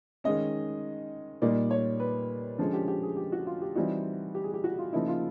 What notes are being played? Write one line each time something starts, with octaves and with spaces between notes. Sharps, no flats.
D#3 G#3 C#4 D#5
A#2 G3 A#3 D#4 D5
C#5
B4
D3 F3 G#3 C#4
G4
G4
G#4
G4
F#4
F4
G4
E3 G3 C4 D#4 F#4
G4
G#4
G4
F#4
F4
C#3 F3 A#3 D#4 E4
F4